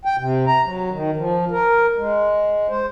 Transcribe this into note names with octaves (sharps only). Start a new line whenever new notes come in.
G5
C3
A#5
F#3
D#3
F3
A#4
G#3
C5